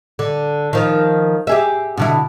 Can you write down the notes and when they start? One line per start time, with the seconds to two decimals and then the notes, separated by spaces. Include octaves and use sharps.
0.19 D3
0.73 D#3 F3
1.47 G4 G#4 E5
1.97 B2 D3 E4